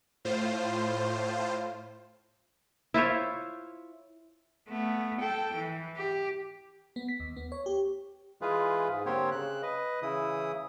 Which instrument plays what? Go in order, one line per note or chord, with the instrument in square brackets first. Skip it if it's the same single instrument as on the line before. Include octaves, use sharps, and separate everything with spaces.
[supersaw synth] A2 F4 C5
[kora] E4 F4 C5 C#5
[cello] A3 B3
A4 G5
E3
G4
[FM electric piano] B3
B6
D#2
B3
C#5
G4
[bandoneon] E3 G#3 F4 G#4 B4
G#2
D3 A#3 C4 G4 C5 C#5
C#3 F#6
B4 D#5
C#3 E3 E4 D#6